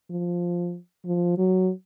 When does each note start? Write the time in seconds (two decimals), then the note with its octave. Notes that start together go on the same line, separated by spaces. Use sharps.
0.10 F3
1.06 F3
1.38 F#3